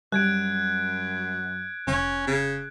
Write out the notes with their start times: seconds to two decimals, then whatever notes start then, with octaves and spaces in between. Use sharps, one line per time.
0.12 F#2 G3 F#6 G#6 D7
1.87 F1 C#4
2.27 C#3